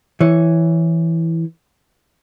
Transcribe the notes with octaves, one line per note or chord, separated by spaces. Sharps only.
E3 C#5